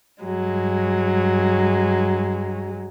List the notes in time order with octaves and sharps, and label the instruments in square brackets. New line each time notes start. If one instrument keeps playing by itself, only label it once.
[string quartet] G2 F#3 G#3